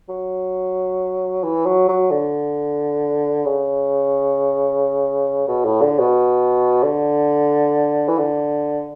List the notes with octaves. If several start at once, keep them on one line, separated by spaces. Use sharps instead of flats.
F#3
E3
F#3
F#3
D3
C#3
B2
A2
D3
B2
D3
E3
D3